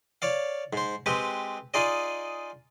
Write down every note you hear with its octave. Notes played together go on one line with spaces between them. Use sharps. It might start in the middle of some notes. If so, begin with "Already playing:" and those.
C#5 D5 F5
G#2 C5
G#3 C4 G4 B4
D#4 F4 G#4 D5 D#5